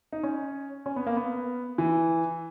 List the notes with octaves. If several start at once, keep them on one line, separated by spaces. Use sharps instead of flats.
D#4
C#4
C#4
B3
A#3
B3
E3